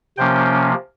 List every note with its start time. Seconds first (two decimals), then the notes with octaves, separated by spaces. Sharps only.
0.17 C3 F3 A#3 C#4 G5